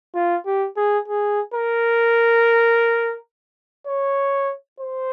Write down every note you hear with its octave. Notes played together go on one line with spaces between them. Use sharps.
F4
G4
G#4
G#4
A#4
C#5
C5